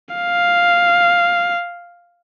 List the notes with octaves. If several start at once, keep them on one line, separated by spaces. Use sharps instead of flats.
F5